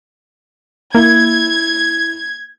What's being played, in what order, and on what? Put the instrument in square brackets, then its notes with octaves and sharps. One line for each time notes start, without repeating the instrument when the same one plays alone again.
[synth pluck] A#3 [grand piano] E4 [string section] G#6